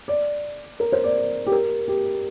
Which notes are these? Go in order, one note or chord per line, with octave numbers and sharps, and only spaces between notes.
D5
A#4
C5
D5
G4
A#4
G4